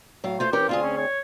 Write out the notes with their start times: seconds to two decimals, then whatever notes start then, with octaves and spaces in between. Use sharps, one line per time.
0.24 A2 F#3 F5
0.40 A3 F4 C5
0.53 E3 C#4 G4 A#4
0.69 D2 C4 F4 G#4
0.83 C#4
0.97 C#5